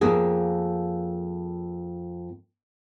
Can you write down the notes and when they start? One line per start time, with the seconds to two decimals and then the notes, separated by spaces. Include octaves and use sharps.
0.01 F2 A#3 G#4